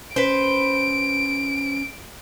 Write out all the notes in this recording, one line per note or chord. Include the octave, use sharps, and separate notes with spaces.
C#4 B4 C5 D7